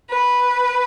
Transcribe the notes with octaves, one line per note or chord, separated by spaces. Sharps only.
B4